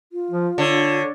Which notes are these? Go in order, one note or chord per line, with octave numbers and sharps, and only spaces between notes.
F4
F3
D3 C#5